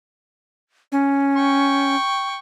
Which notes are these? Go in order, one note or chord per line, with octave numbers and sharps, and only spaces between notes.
C#4
G5 C#6